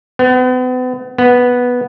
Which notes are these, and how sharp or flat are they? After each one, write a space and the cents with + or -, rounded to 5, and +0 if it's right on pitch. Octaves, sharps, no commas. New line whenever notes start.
B3 +40
B3 -5